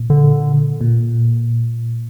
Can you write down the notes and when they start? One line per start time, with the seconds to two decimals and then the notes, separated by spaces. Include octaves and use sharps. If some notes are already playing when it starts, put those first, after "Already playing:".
Already playing: A#2
0.10 D3
0.81 A#2